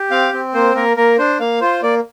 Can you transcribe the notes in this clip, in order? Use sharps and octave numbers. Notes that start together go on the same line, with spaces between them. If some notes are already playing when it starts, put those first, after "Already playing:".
Already playing: G4
C4 F5
C4
A#3 C5
A#3 A#4
A#3 A#4
D4 C5
A#3 F5
F4 C5
A#3 D5